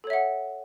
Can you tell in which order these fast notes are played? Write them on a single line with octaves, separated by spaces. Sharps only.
A4 C#5 E5 F#5